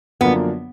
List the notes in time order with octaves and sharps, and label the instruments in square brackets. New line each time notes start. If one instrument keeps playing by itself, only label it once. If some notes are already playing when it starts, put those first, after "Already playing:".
[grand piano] F#2 D3 F3 A#3 D4 [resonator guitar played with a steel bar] B3